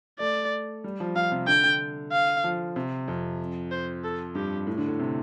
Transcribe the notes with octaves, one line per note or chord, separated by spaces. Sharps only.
A3 D5
G3
F3
F3 F5
C3
D3 G5
D3
F5
F3
C3
F2
C5
A4
G2 G4
A2
D3
A2
C3